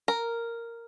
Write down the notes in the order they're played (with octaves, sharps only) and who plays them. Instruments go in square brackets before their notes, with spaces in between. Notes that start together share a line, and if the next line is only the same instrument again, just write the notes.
[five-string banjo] A#4